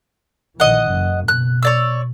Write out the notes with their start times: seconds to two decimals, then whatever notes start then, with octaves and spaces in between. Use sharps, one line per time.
0.60 A#1 D#3 E3 D#5 F#5
0.90 F#1 F#2
1.28 B2 F#6
1.63 C#5 D5 E6